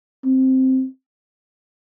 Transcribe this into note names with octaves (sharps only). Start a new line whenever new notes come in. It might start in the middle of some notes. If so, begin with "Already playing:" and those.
C4